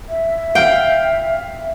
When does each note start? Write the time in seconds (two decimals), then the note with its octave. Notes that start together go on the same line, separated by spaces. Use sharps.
0.09 E5
0.55 F5 G5